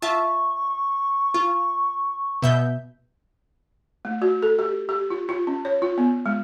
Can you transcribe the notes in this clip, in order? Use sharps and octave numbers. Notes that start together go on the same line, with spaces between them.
F4 E5 A5 C#6
F4
B2 E5 G6
A3
F#4
A4
G4
G4
F4
F4
C#4
C#5
F4
B3
G#3